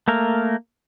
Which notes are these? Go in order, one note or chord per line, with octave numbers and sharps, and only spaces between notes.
A3 A#3 A#4